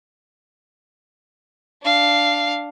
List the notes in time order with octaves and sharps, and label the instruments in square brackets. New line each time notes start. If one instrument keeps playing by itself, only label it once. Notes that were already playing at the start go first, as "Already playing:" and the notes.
[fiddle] D4 F5